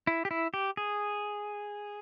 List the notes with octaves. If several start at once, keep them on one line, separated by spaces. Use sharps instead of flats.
E4
G4
E4
G4
G#4